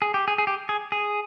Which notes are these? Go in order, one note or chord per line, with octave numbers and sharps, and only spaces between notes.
G#4
G4
G#4
G#4
G4
G#4
G#4